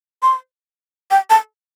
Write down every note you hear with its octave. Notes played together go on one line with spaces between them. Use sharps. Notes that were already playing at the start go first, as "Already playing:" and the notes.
C6
G5
A5